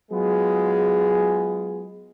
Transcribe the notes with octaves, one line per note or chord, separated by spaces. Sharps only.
F#3 G#3 B3 F4 G#4